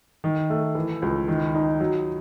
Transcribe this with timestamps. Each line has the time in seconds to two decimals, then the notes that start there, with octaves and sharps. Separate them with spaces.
0.24 D#3
0.50 A3
0.75 E3
1.02 C#2
1.28 D#3
1.55 D#4
1.80 F#3